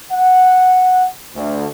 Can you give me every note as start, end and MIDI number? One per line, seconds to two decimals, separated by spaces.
0.12 1.06 78
1.35 1.67 38